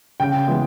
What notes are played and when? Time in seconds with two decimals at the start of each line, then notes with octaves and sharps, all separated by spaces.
0.20 C#3 G5
0.47 E3 G#3 B3 E4